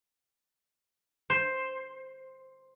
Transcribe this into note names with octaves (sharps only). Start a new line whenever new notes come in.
C5